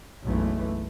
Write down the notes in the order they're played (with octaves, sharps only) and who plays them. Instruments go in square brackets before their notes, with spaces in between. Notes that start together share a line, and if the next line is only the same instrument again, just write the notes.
[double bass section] F#1 B1 E3 A3